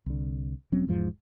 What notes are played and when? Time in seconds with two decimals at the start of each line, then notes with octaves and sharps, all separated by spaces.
0.06 C2 D3
0.72 E1 F#3 C4 C#4
0.87 E1 E2 G#2 F3